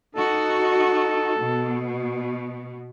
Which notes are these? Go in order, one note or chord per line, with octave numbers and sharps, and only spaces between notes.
D#4 F#4 A4
B2